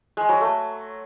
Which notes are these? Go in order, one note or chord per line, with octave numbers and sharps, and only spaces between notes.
G#3
F#3
A3